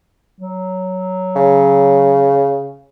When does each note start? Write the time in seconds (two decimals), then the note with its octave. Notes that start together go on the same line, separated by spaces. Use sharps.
0.40 F#3
1.36 C#3